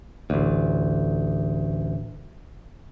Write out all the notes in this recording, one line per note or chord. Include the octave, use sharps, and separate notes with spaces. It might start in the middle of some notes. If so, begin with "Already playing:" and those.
A1 D2